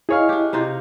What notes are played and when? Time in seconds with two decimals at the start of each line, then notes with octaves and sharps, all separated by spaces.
0.09 E4 G#4 C#5 D#5 F5
0.29 D4 G4
0.53 C3 D#4 F4